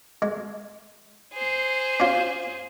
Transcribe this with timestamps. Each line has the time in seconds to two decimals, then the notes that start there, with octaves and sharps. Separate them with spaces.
0.22 G#3
1.34 G#4 C5
2.00 C#4 F4